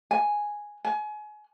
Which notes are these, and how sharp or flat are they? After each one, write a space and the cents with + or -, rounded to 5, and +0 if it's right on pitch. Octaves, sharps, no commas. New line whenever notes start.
G#5 +0
G#5 +30